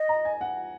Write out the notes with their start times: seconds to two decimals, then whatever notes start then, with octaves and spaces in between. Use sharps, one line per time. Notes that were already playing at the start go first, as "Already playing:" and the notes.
Already playing: D#5
0.09 A#5
0.25 G#5
0.41 F#5